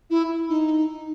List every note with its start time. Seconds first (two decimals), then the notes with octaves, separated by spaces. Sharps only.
0.10 E4
0.49 D#4